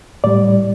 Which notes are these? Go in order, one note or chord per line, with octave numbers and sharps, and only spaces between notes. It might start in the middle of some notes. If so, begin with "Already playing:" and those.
A2 G3 D5